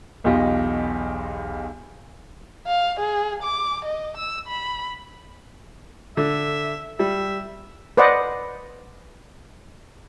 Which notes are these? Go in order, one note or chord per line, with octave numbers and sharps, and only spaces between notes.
B1 E2 F4 G4 D#5
F5
G#4
D6
D#5
E6
B5
D3 E5
G3 E5
B4 C5 D5 D#5 F#5